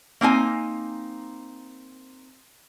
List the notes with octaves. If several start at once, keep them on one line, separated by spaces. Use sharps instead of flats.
A#3 C4 D#4 G#5